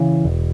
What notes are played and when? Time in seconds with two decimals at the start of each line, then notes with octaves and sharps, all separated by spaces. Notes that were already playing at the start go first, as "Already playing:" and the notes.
Already playing: C#3 E3
0.25 E1